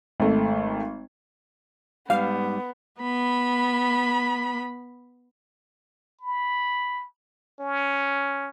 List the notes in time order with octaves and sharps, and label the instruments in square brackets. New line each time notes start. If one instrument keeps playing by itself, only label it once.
[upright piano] G#1 A3
[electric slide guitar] G#2 G3 [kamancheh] B3 [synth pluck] F5
[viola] B3 B5
[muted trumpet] B5
C#4